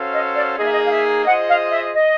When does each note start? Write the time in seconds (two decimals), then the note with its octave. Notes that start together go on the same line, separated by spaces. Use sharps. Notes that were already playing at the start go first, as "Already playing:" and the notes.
Already playing: C#4 F#4 A4 C5 F5
0.13 D#5
0.34 D5
0.57 A#3 D#4 G#4 D#5
0.65 E5
0.73 D#5
0.86 F5
0.92 E5
1.25 F4 G#4 C5 D#5 F#5
1.48 F5
1.71 E5
1.94 D#5